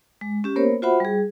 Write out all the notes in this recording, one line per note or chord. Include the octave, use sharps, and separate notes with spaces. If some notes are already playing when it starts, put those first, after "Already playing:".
G#3
C#4 G4
A#3 B3 A#4 C5 C#5
F4 F#4 C5 E5 F#5 B5
G3 G#4